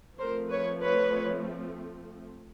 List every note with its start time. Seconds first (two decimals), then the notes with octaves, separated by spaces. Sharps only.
0.18 F3 A3 C4 A#4 C5
0.51 B4 C#5
0.83 B4 C#5